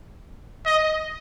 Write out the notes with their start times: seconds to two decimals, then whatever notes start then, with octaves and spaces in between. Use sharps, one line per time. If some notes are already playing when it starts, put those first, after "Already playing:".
0.66 D#5